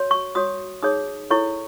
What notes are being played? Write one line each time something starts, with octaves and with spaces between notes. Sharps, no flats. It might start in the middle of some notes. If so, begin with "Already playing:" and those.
Already playing: F#4 C#5
C#6
F#4 C#5 D#6
D#4 G#4 C#5 D#6
E4 A4 C#5 C#6